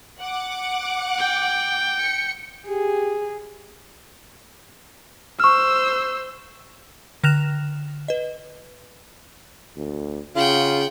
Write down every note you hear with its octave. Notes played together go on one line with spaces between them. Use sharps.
F#5 D6
G5
C#7
G4 G#4
C5 C#6 E6 F6
D3 F6 F#6 A#6 E7 F7
B4 D#5
D2
C#3 F4 F#5 G5